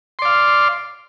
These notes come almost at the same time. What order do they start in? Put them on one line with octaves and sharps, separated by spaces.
C6 D5 F5